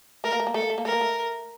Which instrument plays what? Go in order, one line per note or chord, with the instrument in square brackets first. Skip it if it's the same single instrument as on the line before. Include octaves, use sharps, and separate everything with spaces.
[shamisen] A3 [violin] A#4
[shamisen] A#3
A3
A#3
[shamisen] A3 [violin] A4
[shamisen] A#3
A3
A#3
[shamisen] A3 [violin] A#4
[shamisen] A#3
A3